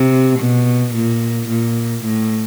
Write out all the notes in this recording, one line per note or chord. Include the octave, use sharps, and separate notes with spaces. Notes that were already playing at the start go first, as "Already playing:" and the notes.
Already playing: C3
B2
A#2
A#2
A2